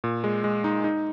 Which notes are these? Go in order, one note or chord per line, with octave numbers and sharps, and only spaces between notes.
A#2
G#3
G#3
D#4
D#4